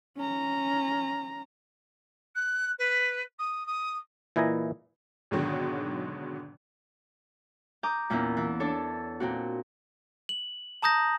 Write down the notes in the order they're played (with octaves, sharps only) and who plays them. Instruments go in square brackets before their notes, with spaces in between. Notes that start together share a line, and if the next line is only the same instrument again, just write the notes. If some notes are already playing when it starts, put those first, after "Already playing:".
[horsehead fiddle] C#4 A#5
[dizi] F#6
B4
D#6
D#6
[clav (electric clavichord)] A#2 E3 E4 D#5 G#5 A#5
[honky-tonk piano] G#1 G#2 B2 D3 D#3 F#3
[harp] A#5 D6 D#6 G6
E2 A#2 A#3 B3 C#4 E4
E3
D4 A4 C#5
A#2 C4 F#4
[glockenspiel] F#7
A5 A#5 D#6 G6 A#6